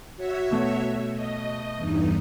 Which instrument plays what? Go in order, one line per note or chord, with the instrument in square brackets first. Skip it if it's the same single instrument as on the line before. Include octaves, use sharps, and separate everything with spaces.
[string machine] F#4 C#5 E5
[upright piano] B2 A3
[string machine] D#5
E2 G2 D#4